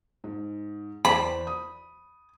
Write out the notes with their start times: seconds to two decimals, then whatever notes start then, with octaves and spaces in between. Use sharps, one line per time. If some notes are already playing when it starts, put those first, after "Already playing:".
0.24 G#2
1.05 E2 C5 D5 B5
1.47 D#6